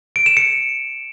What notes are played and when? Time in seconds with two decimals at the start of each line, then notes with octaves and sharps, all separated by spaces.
0.16 D7
0.26 E7
0.37 C#7